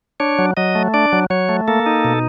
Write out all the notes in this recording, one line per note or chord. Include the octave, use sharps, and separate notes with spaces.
D4 C#5
F#3
F#3 D#5
A3
D4 D5
F#3
F#3 C#5
A3
A#3 A4
D#4
B2